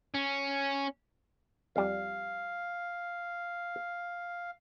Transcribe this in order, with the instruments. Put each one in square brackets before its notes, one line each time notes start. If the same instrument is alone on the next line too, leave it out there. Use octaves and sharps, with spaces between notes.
[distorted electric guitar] C#4
[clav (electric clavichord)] F2 G3 [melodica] F5